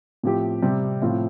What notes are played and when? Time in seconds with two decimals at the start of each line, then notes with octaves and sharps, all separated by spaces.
0.23 A2 F3 C4 G4
0.62 C3 G3 C4
1.02 A2 F3 C4 F4